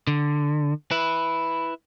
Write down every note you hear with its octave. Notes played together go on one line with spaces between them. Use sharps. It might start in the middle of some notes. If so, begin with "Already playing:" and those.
D3
E4 B4